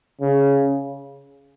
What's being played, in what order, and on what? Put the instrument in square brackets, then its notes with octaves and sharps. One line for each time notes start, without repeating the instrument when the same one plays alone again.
[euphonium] C#3